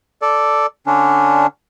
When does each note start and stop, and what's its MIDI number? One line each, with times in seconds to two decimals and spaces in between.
0.22 0.66 69
0.22 0.66 74
0.87 1.47 50
0.87 1.47 61
0.87 1.47 62